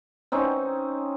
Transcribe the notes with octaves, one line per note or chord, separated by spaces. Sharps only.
C4 C#4 D#4